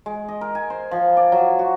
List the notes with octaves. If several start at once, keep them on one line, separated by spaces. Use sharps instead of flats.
G#3
D#5
A#4
G#5
C5
F3
D5
F#3
F#4